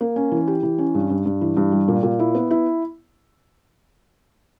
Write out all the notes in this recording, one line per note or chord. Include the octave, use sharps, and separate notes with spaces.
A#3
C#4
E3
G4
E3
C#4
G2
G2
G2
E3
G2
G3
A#2
A#2
E4
B3
E4